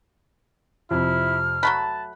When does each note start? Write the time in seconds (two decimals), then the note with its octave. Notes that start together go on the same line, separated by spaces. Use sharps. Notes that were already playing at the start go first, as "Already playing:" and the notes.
0.91 F2 C3 E4 F6
1.63 F#3 A3 A5 B5 F#6